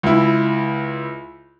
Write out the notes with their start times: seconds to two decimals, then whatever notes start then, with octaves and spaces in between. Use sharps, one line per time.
0.03 C#2 E4